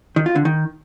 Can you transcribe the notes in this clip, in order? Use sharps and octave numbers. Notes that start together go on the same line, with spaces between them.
D#3
F4
D3
D#3